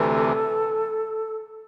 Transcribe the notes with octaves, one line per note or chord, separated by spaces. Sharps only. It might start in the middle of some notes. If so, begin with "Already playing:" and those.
Already playing: D2 C3 E3 A4